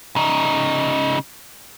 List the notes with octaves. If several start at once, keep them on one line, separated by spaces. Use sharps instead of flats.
C#3 D#4